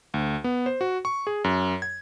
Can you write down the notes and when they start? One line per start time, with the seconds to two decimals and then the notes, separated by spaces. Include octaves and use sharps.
0.14 D2
0.44 B3
0.66 C5
0.81 F#4
1.05 C#6
1.27 G#4
1.44 F#2
1.82 G#6